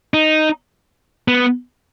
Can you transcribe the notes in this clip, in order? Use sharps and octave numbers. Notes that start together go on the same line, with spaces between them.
D#4
B3